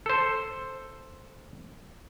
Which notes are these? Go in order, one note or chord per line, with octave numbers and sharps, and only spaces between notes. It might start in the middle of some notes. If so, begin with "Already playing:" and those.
A4 C5